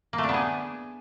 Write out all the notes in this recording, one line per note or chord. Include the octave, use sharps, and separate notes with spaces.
A#3
A3
D4
B3
G#4